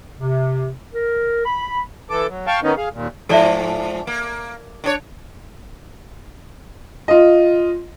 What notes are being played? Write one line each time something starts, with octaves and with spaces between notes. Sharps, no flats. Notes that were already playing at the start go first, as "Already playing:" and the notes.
C3
A#4
B5
E3 A4 D6
F#3
F5 G5 A5 C#6
D#3 B3 C#4 D#4
G#4 F5
D#2 A#2
G#2 F3 A4 D5 E5
A#3
D#3 D4 C#5
F4 D#5